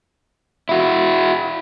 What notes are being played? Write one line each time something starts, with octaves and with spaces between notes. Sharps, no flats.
E4 F#4